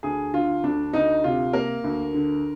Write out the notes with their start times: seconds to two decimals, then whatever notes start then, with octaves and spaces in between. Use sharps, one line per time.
0.03 D2 G#4
0.33 D3 F4
0.63 D2 D4
0.93 D2 D#4
1.24 C3 F4
1.53 A#3 A#4
1.84 D2
2.14 D3